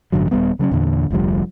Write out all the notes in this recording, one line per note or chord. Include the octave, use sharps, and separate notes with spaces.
A1 G2 D3 F#3
D#1 G2 G3 B3
C#3 F#3 B3 C#4
E2 A#2 D3
F1 D2 F3 G3